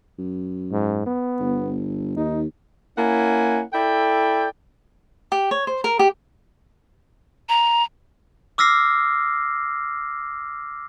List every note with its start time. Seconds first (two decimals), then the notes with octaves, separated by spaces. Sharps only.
0.19 F#2
0.72 G#2
1.06 B3
1.40 G1
2.16 D#2 D#4
2.98 A#3 C#4 E4 F#5 G#5
3.73 E4 A4 D5 G5
5.32 G4
5.51 C#5
5.67 C5
5.84 A#4
5.99 G4
7.49 A#5
8.58 D6 E6 F6 A#6 C7